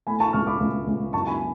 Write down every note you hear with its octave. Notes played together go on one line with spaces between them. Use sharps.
A3 G#5 B5
A5 C#6
C#2 C#6 F6
B5 D6
C#2
C#2
F#2 A5 C#6
G#5 B5